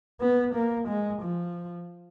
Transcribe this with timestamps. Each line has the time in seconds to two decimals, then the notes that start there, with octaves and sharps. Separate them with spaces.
0.21 B3
0.54 A#3
0.88 G#3
1.22 F3